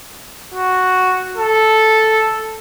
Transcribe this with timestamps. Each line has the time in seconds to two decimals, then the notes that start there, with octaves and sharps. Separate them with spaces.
0.54 F#4
1.37 A4